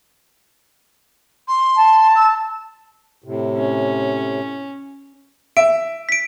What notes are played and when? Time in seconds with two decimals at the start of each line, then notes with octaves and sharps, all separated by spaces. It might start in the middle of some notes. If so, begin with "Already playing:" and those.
1.48 C6
1.77 A5
2.15 E6
3.24 A2 C3
3.57 C#4
5.57 E5 D7
6.09 B6 D7